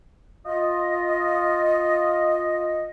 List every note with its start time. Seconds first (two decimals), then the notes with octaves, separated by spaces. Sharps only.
0.45 F4 D#5